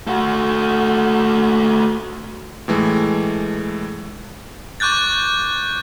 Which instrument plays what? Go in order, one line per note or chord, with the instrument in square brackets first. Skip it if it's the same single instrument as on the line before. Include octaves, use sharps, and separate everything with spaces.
[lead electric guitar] A3 F#4
[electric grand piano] A2 E3 G#3 A3
[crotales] C#6 D6 F#6 G6 A6